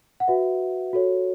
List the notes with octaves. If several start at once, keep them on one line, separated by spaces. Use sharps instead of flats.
F#5
F#4 B4 E5
F#4 A4 C#5